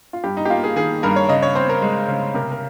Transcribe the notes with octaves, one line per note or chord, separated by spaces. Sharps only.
F4
G2 G4
D#4
G4
A#3 F4
G#4
D#3 G#4
G2 A#4
C#5
C#3 D#5
C#5
C4 C5
A#4
G#3
C#3
C3 A#4
A#4